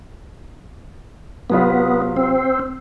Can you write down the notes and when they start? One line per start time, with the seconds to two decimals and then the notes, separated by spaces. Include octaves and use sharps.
1.50 C3 F#3 B3 F4
2.16 C4